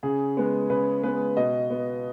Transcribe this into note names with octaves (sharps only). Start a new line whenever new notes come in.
C#3 G#4
G#3 B3
C#3 B4
G#3 B3 B4
B2 D#5
B3